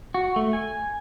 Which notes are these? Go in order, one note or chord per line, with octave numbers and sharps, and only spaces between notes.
F#4
A3
G#5